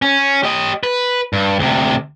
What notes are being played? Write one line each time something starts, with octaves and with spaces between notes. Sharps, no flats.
C#4
G4 D#5
B4
G2
D2 C3